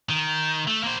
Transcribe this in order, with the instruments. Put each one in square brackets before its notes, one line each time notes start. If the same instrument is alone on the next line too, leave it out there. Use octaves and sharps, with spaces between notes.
[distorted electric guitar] D#3
A3
A#3 C5